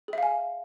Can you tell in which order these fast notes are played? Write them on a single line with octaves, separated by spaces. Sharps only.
G#4 E5 F5 G#5